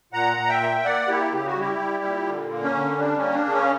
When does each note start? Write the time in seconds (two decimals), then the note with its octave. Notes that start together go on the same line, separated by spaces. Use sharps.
0.13 A#2 F#5 A#5
0.37 A#2
0.49 E5 G5
0.60 A#3
0.84 A#3 D5 F#5
1.08 A#3 E4 G4
1.32 C#3 G4
1.46 F#4
1.56 G3 E4 G4
1.79 G3
2.04 A#2
2.27 D3
2.51 A#3
2.63 C#4
2.75 D3
2.98 G3 D4
3.17 C#4
3.22 A#3
3.34 D4
3.46 C#3
3.53 C#4